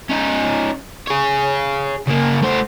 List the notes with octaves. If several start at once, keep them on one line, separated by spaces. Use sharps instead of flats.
C#4 D#4
G#4 C#5
C#3 A#3
A3 C5